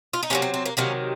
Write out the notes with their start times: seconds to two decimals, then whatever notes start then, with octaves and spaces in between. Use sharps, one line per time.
0.13 F4
0.23 D#4
0.30 C3 D#3 F#3 A#3 C#4
0.42 C4
0.54 C4
0.66 A#3
0.77 C3 D#3 F#3 A#3 C#4